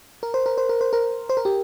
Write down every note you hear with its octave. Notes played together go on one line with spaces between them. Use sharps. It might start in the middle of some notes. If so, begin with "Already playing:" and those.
A#4
C5
A#4
C5
A#4
C5
A#4
C5
A#4
G4